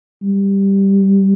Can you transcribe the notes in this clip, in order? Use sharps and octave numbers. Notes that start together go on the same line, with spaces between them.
G3